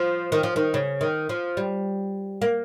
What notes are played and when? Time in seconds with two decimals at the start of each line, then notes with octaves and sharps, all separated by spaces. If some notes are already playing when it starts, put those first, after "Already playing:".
Already playing: F3
0.32 D#3
0.43 F3
0.56 D#3
0.74 C#3
1.01 D#3
1.29 F3
1.57 G3
2.42 A#3